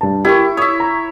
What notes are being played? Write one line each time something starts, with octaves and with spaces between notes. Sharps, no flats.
G2 A5
E4 G4 A#4 C#6
C#5 E5 D#6
A#5